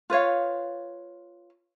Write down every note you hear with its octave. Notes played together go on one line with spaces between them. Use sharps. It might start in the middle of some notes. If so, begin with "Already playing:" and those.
F4 B4 C#5 F5